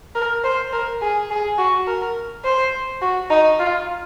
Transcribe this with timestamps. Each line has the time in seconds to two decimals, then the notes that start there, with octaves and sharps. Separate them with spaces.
0.15 A#4
0.44 C5
0.73 A#4
1.02 G#4
1.30 G#4
1.58 F#4
1.87 A#4
2.45 C5
3.02 F#4
3.30 D#4
3.59 F4